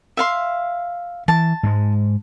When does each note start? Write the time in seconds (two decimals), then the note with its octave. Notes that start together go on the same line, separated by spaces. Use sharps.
0.17 E5 F5 C6
1.28 E3 A5
1.63 G#2 G#3